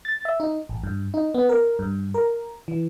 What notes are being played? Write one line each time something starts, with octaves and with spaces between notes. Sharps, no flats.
A6
E5
D#4
A1
G2
D#4
B3
A#4
G2
A#4
E3